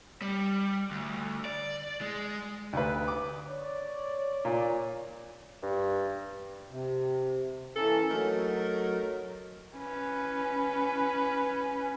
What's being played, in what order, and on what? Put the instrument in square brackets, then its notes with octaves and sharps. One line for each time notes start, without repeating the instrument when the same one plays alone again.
[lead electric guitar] G3
D2
D5
G#3
[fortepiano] D2 B4
D6
[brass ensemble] C#5 D5
[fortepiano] A#2
[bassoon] G2
[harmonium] C3
[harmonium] E3 C#4 A5 [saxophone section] A#3 A4
[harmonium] F#3 [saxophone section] A3 D#4 A#4
[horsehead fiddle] C#4 B4